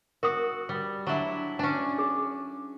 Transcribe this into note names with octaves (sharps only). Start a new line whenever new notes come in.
F#4 A#4 D#6
G3
F#3 D4 E4
C#4 D4 G#5
G#4